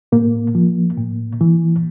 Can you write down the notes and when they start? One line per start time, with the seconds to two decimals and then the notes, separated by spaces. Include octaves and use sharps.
0.12 A2 A#3
0.55 F3
0.97 A2
1.41 E3